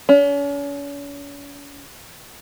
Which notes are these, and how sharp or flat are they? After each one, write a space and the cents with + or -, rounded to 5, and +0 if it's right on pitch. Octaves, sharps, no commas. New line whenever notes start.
C#4 +40